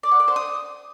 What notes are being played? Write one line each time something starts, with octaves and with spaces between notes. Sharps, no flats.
D5
F#5
D5
C5
D#6